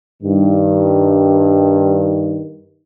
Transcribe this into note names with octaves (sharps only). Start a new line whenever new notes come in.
G2 D#3